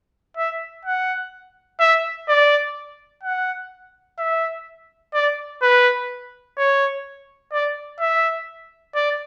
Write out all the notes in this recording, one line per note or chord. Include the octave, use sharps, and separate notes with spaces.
E5
F#5
E5
D5
F#5
E5
D5
B4
C#5
D5
E5
D5